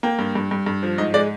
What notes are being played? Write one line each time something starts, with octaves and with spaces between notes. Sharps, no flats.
A#3 G5
G2
G2
G2
G2
F3
G#2 D#5
G#3 D5